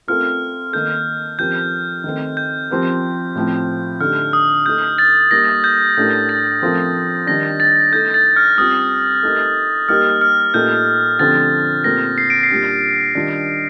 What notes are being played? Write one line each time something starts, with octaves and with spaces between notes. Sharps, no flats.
A3 C4 F4 A#4 F6
D#3 A#3 D#4 A4 G6
F3 C4 G4 A#4 G6
D#3 A3 C4
G6
F3 C4 G4 A#4
A2 F3 C4
D3 A3 D#4 G4 F6
D#6
A3 D#4 A4 G6
A6
G3 A#3 D#4 A#4 A#6
G6
A2 A3 D4 G4 A#4 G6
A6
F3 A3 C4 F4 A#4
D#3 G3 D4 A#6
A6
A3 D#4 A4 G6
A6
F6
G3 C4 F4 D#6
A3 D#4 G4 A#4
G3 A#3 D#4 G4 A#4 F6
F6
A#2 A3 D#4 G4 A#4 G6
D3 F3 A3 C4 G4 A6
A#2 A3 C4 G4 A#4 A#6
C7
D7
C7
A#2 G3 D4 G4
D#3 G3 D4 F4